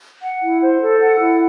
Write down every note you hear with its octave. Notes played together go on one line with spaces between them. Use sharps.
F#5
E4
C5
A4
F#5
E4